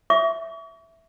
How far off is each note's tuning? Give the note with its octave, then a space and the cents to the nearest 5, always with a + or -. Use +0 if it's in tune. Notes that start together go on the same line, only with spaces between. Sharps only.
E5 +0 C#6 +40